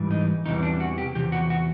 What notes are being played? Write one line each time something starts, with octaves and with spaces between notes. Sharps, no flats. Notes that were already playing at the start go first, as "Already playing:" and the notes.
Already playing: G#2 E3 G3
D#4
E2 C3 E3 G3 D#4
D4
F#4
G4
E2 C3 G4
F#4
F#4